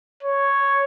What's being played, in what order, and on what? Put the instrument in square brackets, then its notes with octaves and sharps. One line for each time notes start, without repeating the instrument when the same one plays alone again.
[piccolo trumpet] C#5